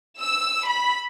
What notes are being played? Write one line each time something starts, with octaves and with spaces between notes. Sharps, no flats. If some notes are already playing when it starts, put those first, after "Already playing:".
E6
B5